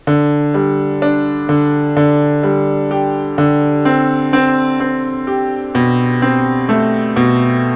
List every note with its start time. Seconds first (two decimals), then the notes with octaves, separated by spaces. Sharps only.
0.07 D3
0.54 G3
1.02 D4
1.49 D3
1.97 D3
2.43 G3
2.91 G4
3.38 D3
3.85 C4
4.33 C4
4.80 C4
5.27 G4
5.75 B2
6.22 C4
6.69 A3
7.16 B2